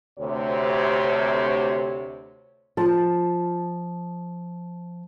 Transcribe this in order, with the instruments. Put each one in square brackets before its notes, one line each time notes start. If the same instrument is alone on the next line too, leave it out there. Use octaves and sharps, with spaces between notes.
[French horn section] D2 C3 C#5
[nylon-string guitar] F3 A5